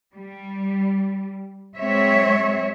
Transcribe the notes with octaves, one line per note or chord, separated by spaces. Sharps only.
G3
F#3 G#3 C4 C#5 E5